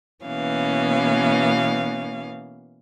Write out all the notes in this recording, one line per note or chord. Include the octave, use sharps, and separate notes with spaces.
B2 E3 A#3 B3 C#4 F5